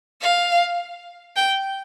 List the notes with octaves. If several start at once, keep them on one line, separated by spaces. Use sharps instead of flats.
F5
G5